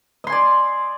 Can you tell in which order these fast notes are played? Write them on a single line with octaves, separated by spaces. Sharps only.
D#5 C6 G#5 D5